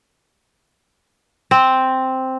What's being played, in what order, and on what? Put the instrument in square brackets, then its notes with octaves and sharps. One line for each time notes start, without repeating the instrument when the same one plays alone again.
[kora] C4